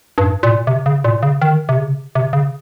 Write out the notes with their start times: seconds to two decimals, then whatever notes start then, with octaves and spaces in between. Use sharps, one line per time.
0.18 G2
0.43 A#2
0.67 C3
0.86 C#3
1.04 A#2
1.23 C#3
1.42 D#3
1.69 C3
1.78 C#3
2.15 C3
2.33 C#3